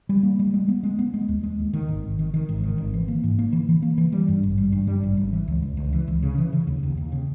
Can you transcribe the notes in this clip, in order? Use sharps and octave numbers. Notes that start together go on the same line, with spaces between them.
G3
A#3
G3
G#3
B3
G#3
B3
G#3
D#2
G#3
D#2
D#3
G#1
G#1
D#3
D#3
G#1
D#3
G#1
E3
A#3
G#2
A#3
E3
E3
A#3
E3
G3
G2
G#1
G3
G2
G3
G#1
G#1
E3
C#2
C#2
C#2
E3
C#2
C#3
E3
C#3
D#2
D#2
D#2
C#3